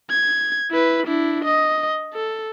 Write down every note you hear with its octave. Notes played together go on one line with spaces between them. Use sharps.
G#6
E4 B4
D4 E4
D#5
A4